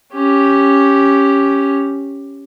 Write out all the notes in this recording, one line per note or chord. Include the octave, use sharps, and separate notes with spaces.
C#4 G4